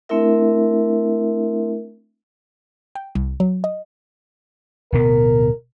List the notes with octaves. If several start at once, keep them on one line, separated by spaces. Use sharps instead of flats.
A3 C4 D4 E4 A#4 E5
G5
C2
F#3
D#5
D1 B2 B3 A#4